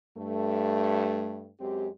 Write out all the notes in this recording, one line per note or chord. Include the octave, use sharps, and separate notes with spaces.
G2 A3
F#2 G#3 C4 G4